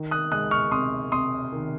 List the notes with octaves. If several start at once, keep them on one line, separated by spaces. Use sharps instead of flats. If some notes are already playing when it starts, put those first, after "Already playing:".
Already playing: D#3
D#6 F#6
G#3 D#6 F#6
C#6 F6
C3 C6 D#6
C3 C6 D#6
D#3